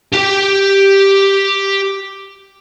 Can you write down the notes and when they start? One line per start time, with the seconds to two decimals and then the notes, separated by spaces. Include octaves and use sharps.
0.13 G4 G5